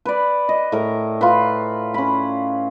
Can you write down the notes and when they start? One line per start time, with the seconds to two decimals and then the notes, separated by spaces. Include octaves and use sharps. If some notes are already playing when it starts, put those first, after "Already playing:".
0.06 B4 D5
0.49 D#5
0.72 A2 A#4
1.21 F4 B4
1.94 C#4 B5